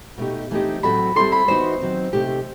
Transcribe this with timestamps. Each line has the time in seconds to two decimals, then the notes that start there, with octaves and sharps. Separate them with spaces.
0.18 B2 A3 D#4 G4
0.51 E3 A3 C4 D#4 G4
0.83 A2 F#3 C4 F#4 A4 B5
1.16 G3 C4 E4 A4 C6
1.32 B5
1.48 E3 B3 D#4 F#4 C5
1.81 D#3 F#3 C4
2.13 C3 E3 A3 D#4 G4